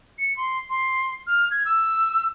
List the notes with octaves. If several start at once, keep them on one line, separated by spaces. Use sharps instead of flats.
C#7
C6
C6
F6
G#6
E6